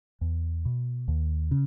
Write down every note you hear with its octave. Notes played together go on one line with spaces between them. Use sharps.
E2
B2
D#2
C#3